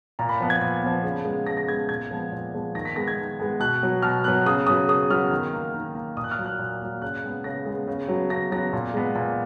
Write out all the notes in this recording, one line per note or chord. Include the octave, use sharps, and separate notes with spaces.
A#2 A#5
B5
F3 B3
G#6
A#2
F3 B3
C#3
G#3 B3
C#3 A#6
A#6
G#3 B3 G#6
A#2 G#6
F3 G#3 B3
A#2
F3 G#3 B3
D#3 A#6
B6
G#3 B3 A#6
G#6
D#3
G#3 B3
B2 F#6
F#3 B3
B2 F6
F#3 B3 F#6
C#3 D#6
F#3 B3 D#6
C#3 D#6
F#3 B3 F6
D#3
A#3
D#3
A#3
A#2 D#6
F#6
F6
F#3 A#3
F#6
A#2
F#3 A#3
C#3 F#6
G#3 B3
C#3 A#6
G#3 B3
C#3
F#3 B3
C#3 A#6
F#3 B3 A#6
A#2
G#3 B3
A#2